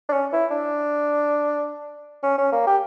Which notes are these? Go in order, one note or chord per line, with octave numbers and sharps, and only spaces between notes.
D4
C#4
E4
D4
C#4
C#4
A#3
G4